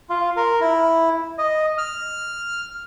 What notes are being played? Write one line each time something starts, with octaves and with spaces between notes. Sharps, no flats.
F4
A#4
E4
D#5
F6